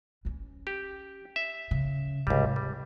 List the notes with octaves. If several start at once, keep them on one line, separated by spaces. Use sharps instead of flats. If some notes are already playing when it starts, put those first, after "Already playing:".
E3 C#4
G4
E5
C#3
C#2 G#2 C3 G3
G3